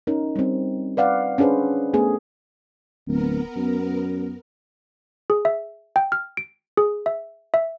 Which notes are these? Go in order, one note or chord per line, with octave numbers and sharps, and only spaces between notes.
C#4 D#4 A#4
G3 C4
B4 D5 F5 F#5
C#4 D4 G#4 B4 C5
A3 B3 G#4
D1 B3 A#4
F#2
G#4
E5
G5
F6
D7
G#4
E5
E5